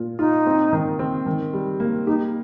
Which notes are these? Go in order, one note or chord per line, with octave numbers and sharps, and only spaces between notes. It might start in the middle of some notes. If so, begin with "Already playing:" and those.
Already playing: A#2 F4
D#4 F4
C4
D#3
C4
D#3
G3
A#3
D#4 G4